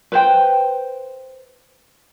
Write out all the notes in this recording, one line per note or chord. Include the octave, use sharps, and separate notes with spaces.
B4 C5 G5